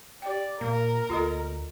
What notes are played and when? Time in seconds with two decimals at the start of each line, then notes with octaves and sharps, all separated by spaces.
0.22 G4 D5 G5
0.61 A#2 A#3 A#4
1.10 D2 F4 A4 D#5